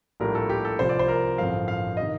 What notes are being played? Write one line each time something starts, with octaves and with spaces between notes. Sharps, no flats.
A#1 A2 G3 A#4
A4
G4
A4
C2 C3 F3 C4 F4 C5
D5
C5
A#4
A1 G2 D3 F3 C4 F5
F5
C3 D#3 D#5